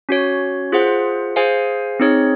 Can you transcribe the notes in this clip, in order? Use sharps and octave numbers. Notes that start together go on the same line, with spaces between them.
C#4 F#4 C#5
F4 G#4 C5 F#5
G#4 C5 F5 G#5
C4 D#4 G#4 C#5